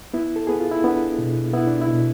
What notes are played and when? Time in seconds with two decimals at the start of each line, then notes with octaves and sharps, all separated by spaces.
0.14 B3 E4
0.36 A4
0.47 B3 G#4
0.60 F4
0.72 E4
0.84 B3 D4
1.19 B2
1.53 B3 E4
1.67 D4
1.81 E4
1.88 B2